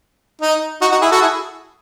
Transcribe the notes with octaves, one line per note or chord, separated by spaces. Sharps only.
D#4
D#4 F#4
D#4 F#4
E4 G#4
F#4 A4
E4 G#4